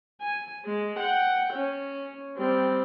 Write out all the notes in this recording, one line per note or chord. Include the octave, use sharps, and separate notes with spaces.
G#5
G#3
F#5 G5
C#4
G3 C4